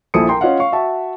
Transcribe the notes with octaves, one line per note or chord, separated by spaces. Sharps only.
A#1 F3 E4 A4 D#6 C#7
A#4 G5 A#5 C6
C#4 F4 C#5 D#5 F5 F#5
F5 C#6
F#4 E5 F#5 A5 C#6